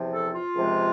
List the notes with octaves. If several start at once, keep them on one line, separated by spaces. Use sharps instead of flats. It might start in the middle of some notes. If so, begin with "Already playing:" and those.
Already playing: E2 C3 F3
A4
F4
C#2 C3 F3 G#3